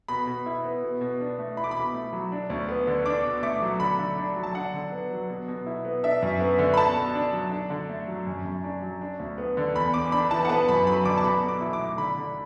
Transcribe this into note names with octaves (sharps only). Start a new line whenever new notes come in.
B2 B5
B2
E4
B3
B2
B2
D4
A3
E4 B5
D6
B2 B5
A3
F#3
D4
D2
B3
D3
D4 D6
B2
A3 D6
F#3
D3 B5
D3
D4
F#3
A5
D4 F#5
D3
B3
F#3
B2
B2
E4
B3
D4 E5
F#2
B3
D3
B5
B2 A5
B2
D4
F#3
D4
D3
A3
F#3
F#2
F#2
D4
F#3
D4
D2
B3
D3
E2 B5
E2 D6
D4 B5
E3 A5
F#5
B3 A5
F#2 B5
F#3 B5
D3 D6
A5
B2 B5
B2
D6
E4
D6
A3
D3 B5
D3